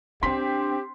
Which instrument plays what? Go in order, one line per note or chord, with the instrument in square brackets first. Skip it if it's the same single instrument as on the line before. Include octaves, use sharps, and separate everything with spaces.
[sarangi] C4 [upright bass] D4 [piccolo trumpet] G4 [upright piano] C6 B6